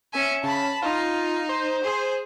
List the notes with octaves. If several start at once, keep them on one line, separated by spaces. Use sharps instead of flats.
C#4 E5 G#5
C#3 A5 B5
D#4 F4
C5
G#4